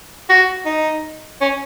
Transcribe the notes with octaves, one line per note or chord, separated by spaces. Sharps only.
F#4
D#4
C#4